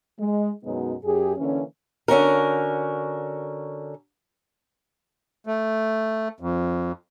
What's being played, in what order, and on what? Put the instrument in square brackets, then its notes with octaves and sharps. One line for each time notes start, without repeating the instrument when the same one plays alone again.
[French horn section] G#3
F#2 B2 F#3 G#3 B3 D#4
F#2 G4 G#4
D3 E3 A#3 C#4
[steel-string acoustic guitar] D3 C#4 F#4 A#4
[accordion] A3
F2